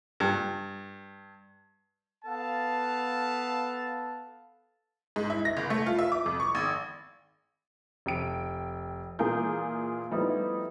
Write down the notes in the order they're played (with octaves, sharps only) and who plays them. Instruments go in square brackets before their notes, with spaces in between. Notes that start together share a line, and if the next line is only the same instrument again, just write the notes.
[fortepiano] G2
[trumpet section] B3 A4 F5 A5
[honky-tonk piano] G#2
E4
A#6
F#1
A3
F4
E5
D6
F2
C#6
G#1
F1 G5 D7
A#2 E3 F4 G#4 A#4 G6
F3 G3 A3 B3 D#4 E4